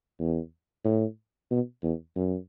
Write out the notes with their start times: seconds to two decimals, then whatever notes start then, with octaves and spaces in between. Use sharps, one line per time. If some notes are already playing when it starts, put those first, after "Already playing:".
0.19 E2
0.85 A2
1.51 B2
1.83 E2
2.16 F#2